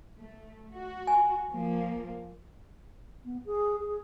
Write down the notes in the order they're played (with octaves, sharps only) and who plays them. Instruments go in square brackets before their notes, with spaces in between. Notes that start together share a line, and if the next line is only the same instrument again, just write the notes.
[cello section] A3
F#4
[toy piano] G#5
[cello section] F3 A#3
[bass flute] B3
G#4
G#4